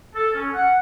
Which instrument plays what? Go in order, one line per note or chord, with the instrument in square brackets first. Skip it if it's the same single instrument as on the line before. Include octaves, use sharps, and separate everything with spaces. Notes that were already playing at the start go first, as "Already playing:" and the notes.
[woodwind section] A4
C#4
F#5